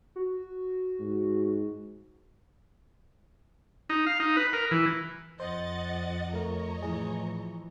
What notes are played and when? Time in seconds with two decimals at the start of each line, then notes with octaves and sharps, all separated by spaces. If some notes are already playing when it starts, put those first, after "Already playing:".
0.16 F#4
0.99 G#2
3.90 D#4
4.06 F5
4.20 D#4
4.37 B4
4.53 A#4
4.71 E3
5.40 F2 C5 D#5 F#5 A6
6.33 A3 A#4 C#5 D#5 A#5
6.82 A2 E3 F3 G#4